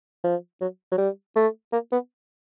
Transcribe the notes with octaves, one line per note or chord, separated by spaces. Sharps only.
F3
F#3
F#3
G3
A3
A#3
B3